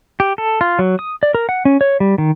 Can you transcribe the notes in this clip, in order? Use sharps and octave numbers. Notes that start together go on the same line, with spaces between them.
G4
A4
F4
F#3
D#6
D5
A#4
F#5
C#4
C#5
G3
D#3